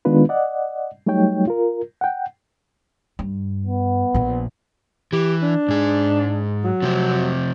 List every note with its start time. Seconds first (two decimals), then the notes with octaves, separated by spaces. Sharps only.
0.05 D#3 G#3 B3 D4 F4 B4
0.29 D5 D#5 F#5
1.06 F#3 G3 A3 D#4 C#5 G5
1.48 F4 A#4
2.01 F#5 G5
3.19 G2
3.67 B3
4.14 A#1 A#2
5.13 E3 G4
5.43 D4
5.68 G#2 G#4
6.64 F#3
6.82 C3 F3 C4